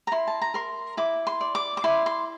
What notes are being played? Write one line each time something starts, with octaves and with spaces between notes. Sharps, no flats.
A#5
E4 C6
A5
A#5
A#4 C6
E4 D6
C6
D5
D6
D6
E4 C6
C6